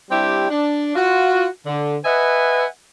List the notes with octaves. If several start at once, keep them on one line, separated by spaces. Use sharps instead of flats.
G3 C4 D4 E4 G4
D4
F4 F#4
D3
B4 D#5 E5 F#5 G#5